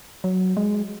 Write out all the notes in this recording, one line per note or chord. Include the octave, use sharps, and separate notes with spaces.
F#3
G#3